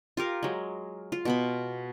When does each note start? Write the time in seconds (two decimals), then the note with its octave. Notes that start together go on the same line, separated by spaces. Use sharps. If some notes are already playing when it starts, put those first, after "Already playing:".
0.17 F4 G4 A#4 F5
0.43 F#3 G#3
1.12 F4
1.25 B2 B3 B5